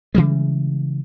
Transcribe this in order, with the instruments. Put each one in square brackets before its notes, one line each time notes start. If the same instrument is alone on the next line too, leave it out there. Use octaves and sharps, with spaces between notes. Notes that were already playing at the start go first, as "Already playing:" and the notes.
[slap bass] C#3 E3 G3 G#3